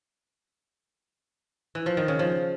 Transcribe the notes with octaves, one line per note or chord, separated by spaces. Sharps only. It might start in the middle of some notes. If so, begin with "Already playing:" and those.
E3
F3
D#3
C#3
F3